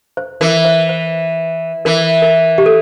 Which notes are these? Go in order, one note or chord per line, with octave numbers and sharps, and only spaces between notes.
C5
E3 A#4
C5
C5
E3 A#4
A#4
G4
A4